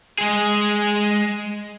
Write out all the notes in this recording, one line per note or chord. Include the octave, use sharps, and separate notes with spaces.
G#3 G#4